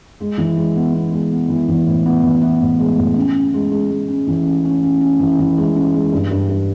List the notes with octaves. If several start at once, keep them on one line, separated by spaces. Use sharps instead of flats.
G#3
E3
G#3
B3
B3
G#3
B3
E3
E3
A2
B3
E3
B3
A2
G#3
A2
C#3
C#3
G#3
G#3
G#3
C#4
E3
C#3
C#4
C#4
C#4
E3
E3
G#3
C#4
G#3
G2
G2
G2